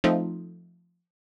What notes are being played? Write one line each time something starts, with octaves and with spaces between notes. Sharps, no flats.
F3 A3 C4 D#4